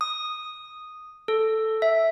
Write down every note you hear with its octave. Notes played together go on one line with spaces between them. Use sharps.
D#6
A4
E5